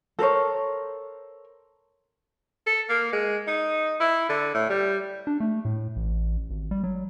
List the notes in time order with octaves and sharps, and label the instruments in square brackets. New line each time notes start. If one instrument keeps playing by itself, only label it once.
[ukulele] A4 A#4 C5 C#5
[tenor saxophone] A4
A#3
G#3
D#4
E4
D3
A2
G3
[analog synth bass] D4
A3
A2
A1
G#1
G3
F#3